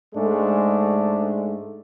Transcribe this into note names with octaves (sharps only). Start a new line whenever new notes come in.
G#2 G#3 A3 D4